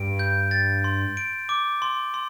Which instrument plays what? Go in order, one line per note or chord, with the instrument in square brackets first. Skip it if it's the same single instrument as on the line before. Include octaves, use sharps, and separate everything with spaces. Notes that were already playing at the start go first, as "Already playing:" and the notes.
Already playing: [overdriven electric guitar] G2 [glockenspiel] D7
[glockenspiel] G6
A6
C6
D7
D6
C6
C6